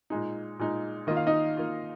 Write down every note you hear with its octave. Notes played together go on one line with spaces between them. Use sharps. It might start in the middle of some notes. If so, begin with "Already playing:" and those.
A#2 G#3 D#4
A#2 G#3 D#4
D#3 A#3 F4 D#5
F5
D#4 D#5
D#3 A#3 F4